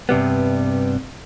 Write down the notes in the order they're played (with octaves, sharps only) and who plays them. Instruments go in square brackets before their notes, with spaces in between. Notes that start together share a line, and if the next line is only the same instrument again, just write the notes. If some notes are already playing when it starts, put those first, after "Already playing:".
[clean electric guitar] G2 C3 G3 B3